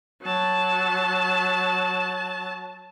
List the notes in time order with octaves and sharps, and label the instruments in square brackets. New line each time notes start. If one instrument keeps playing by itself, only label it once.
[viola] F#3 A5